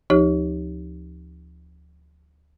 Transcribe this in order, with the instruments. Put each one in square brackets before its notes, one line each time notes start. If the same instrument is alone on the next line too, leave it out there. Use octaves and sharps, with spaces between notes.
[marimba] D2 F3 D#4 G4 C#5